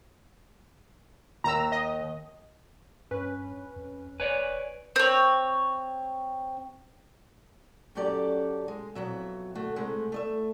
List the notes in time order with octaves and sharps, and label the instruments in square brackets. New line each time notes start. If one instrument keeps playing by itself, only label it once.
[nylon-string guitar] D#2 [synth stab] A#5 E6
[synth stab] D#5
[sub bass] G2 [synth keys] C#4 B4
[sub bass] F2
[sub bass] E1 [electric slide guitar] B4 C#5 D5 [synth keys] G#5
[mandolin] C4 C#5
[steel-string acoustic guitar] F#2 F#3 C#4 G4 A4 D5
G#3
F2 B2 F#3 E5
D2 A3 F#4
C3 G#3 A3
A3 D#5 E5